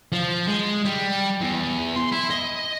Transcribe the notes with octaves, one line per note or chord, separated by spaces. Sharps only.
F3
G#3
G3
E2
C6
E4
D#5